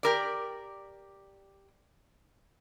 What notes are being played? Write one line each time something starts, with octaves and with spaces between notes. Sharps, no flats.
G4 A#4 D5